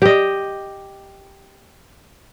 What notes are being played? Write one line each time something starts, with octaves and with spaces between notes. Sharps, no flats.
G4 D#5